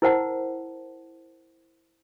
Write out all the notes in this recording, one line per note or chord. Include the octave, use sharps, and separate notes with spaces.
E4 A#4 C5 F#5 A5